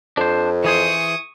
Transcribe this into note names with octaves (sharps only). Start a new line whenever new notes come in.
F2 D4 C5
E3 G#4 C5 C#6 D#6